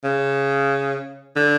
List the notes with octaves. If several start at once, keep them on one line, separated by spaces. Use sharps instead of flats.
C#3
D3